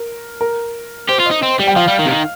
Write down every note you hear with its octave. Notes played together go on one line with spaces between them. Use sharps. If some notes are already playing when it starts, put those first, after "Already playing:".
Already playing: A#4
A#4
G4 C5
F4
D#5
D#4
C4
G3
G5
F3 F5
G3
D#3
C3
D#3